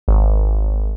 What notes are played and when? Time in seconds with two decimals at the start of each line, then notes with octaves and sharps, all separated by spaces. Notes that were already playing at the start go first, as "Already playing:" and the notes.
0.08 G#1